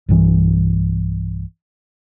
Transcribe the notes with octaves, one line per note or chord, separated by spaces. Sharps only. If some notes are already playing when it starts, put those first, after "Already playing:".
B1 G2 E3